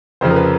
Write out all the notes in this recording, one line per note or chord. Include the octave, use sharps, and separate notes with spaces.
F1 F2 C#3 F3 C5
A#4
B4